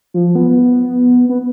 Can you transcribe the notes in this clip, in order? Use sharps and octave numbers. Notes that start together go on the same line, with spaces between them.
F3
B3
B3